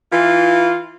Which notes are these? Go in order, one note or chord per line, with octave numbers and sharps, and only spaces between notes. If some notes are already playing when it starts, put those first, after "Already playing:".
E3 F4